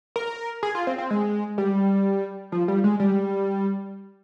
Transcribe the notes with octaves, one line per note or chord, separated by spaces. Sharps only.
A#4
G#4
F4
C4
C4
G#3
G3
F3
G3
G#3
G3